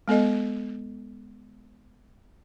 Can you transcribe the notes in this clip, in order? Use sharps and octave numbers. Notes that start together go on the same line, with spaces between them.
G#3 B3 A4 D#5